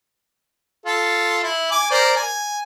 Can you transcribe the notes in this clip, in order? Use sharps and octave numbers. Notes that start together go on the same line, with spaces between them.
F4 A4
E4
G#5 D6
A#4 C5 D5
G#5